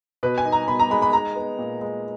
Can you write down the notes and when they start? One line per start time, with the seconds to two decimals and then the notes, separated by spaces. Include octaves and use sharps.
0.23 B2 B4
0.38 G#5
0.45 D#4
0.52 A#5
0.68 B2 B5
0.80 A#5
0.90 G#3 B5
1.02 B5
1.12 D#4 A#5
1.35 B3
1.59 A#2
1.81 G#3